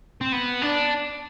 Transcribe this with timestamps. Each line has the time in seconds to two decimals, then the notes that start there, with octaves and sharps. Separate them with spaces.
0.21 C4
0.32 B3
0.62 D4